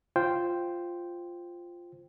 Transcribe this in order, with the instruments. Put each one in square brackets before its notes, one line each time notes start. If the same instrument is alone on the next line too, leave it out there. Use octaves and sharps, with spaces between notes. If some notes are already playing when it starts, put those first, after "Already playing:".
[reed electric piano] F4 C5 G5